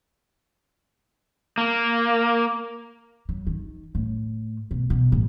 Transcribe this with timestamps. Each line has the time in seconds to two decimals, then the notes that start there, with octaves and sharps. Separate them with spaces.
1.58 A#3
3.29 F#3
3.47 D#3
3.95 A2
4.71 B2
4.90 B2
5.12 A1